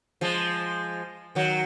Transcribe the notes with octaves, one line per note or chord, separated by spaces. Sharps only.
F3 G#3
D#3 F#3